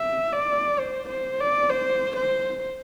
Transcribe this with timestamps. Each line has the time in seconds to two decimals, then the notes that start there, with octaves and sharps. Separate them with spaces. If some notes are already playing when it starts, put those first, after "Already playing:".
Already playing: E5
0.33 D5
0.79 C5
1.09 C5
1.40 D5
1.70 C5
2.16 C5